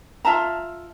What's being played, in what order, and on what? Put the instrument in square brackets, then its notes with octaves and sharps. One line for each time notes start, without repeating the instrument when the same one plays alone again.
[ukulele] F4 E5 A5 A#5